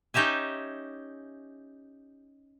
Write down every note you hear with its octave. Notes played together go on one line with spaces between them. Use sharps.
C#4 D#4 G4 E5 G#5